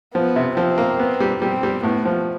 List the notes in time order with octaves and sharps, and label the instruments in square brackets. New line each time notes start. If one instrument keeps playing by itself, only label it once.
[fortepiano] F3 [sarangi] B3
[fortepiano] C3
[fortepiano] F3 [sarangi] C4
[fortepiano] A#3
B3
G3
[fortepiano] G3 [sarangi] C4
[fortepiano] G3
[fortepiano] A2 [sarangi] B3
[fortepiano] F3